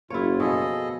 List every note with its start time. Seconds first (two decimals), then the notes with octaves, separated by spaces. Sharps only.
0.10 F#1 E4 F4 C#5
0.40 B2 F3 B3 G#4 A4 D#5